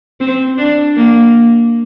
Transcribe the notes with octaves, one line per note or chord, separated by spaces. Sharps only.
C4
D4
A#3